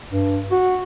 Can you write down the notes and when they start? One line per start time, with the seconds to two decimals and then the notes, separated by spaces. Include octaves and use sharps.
0.11 G2
0.51 F#4